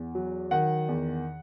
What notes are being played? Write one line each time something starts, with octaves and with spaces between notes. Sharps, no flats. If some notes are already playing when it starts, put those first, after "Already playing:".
Already playing: E2
F#3
D#3 F#5
E2